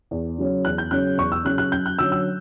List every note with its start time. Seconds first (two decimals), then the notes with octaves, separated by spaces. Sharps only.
0.11 E2
0.38 C#3 F#3 C#4
0.65 E2 F#6
0.78 G6
0.91 C#3 F#3 C#4 F#6
1.18 E2 C#6
1.32 E6
1.44 C#3 F#3 C#4 F#6
1.58 F#6
1.72 F#2 G6
1.86 F#6
1.99 D3 F#3 C#4 E6
2.12 E6